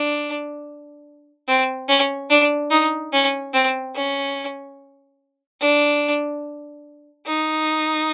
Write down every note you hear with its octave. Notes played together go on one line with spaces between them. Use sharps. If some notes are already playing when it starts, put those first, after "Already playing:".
Already playing: D4
C4
C#4
D4
D#4
C#4
C4
C#4
D4
D#4